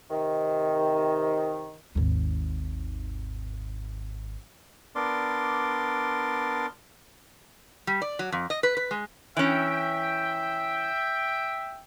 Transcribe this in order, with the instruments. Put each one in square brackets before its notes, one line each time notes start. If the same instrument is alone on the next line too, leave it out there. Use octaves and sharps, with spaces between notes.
[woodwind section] C3 D#3
[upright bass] G#1 D#2
[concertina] B3 D4 A#4 D5 C6 D6
[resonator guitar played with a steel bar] G3
D5
F#3
F2
D#5
B4
B4
G#3
[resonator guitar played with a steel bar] E3 C#4 [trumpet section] E5 G5